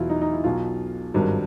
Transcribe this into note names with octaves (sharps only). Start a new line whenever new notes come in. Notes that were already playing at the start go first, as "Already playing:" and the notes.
Already playing: E2 B2 F#3 E4 F4
D#4
D#4
E4
B1 B2 F#3 F4
G#1 G2 D#3 F#3